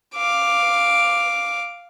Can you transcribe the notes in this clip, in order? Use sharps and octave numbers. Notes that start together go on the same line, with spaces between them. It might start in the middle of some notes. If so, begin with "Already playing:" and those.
F5 D6